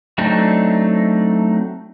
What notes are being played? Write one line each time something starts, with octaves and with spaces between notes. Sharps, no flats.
F#3 A3 C4 D4 D#4